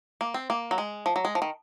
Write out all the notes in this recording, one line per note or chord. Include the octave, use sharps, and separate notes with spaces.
A#3
C4
A#3
F#3
G#3
F3
F#3
G#3
F3
D#3